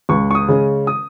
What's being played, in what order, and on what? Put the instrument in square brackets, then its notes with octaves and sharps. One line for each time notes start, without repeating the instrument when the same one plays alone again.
[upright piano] C#2 C#6
C#6
D#6
C#3 G#3 C#4
D#6